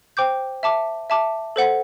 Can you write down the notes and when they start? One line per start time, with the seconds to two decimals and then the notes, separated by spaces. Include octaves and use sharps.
0.17 C5 G5 D6 G6
0.63 E5 A5 D6
1.10 E5 A5 D6
1.56 A4 C5 F#5